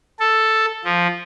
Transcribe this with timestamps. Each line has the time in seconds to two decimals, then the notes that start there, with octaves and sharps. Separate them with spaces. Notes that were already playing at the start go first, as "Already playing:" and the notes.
0.19 A4
0.85 F3